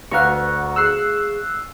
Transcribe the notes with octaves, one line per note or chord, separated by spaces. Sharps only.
D2 B4 F5 F#5 A#5 C#6
G#4 C#6 E6 F#6 C7